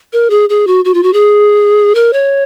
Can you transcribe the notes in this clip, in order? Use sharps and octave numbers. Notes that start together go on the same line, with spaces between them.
A#4
G#4
G#4
F#4
F#4
F4
F#4
G#4
A#4
C#5